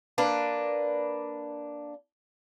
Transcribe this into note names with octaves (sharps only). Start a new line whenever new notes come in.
A#3 D4 B4